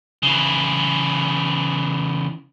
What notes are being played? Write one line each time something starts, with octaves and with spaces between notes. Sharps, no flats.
C#3 E3